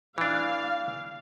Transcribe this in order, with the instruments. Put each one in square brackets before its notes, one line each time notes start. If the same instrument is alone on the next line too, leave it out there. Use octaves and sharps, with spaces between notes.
[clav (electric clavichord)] E3 D4 [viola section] F5